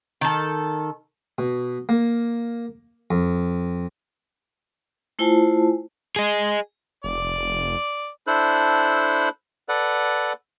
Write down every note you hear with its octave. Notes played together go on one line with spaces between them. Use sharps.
D#3 A4
B2
A#3
F2
A3 E4 F4 C5 G#5 A5
G#4 D#5
F1 D5
D4 E4 A4 C5 F#6
A4 B4 D5 F#5